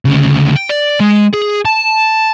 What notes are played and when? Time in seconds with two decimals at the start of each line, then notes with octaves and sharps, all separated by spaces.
0.05 D2 C#3
0.56 G5
0.69 D5
1.00 G#3
1.33 G#4
1.65 A5